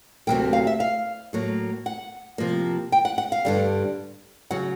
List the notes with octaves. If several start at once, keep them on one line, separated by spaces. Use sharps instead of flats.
D2 C3 D#3 F#3 A#3 G5
F5
E5
F5
A2 F#3 A#3
F#5
C3 F3 A#3
G5
F#5
F#5
F5
G2 D3 G3
C#3 F#3 F#5